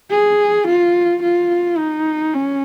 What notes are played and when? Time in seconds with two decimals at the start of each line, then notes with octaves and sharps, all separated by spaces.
0.11 G#4
0.67 F4
1.22 F4
1.78 D#4
2.34 C#4